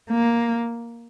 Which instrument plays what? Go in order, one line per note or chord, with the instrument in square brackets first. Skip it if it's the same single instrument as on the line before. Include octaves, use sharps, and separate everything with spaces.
[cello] A#3